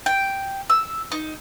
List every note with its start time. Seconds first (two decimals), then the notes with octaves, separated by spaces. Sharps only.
0.06 G5
0.70 E6
1.12 D#4